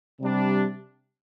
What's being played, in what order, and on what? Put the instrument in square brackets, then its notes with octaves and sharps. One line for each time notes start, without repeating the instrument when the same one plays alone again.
[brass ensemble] C3 G3 D4